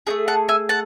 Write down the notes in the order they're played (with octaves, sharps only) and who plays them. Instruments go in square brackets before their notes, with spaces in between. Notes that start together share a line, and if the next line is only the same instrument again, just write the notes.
[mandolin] A3 D#4 G#4
F#5 A5
E5 G#5
F#5 A5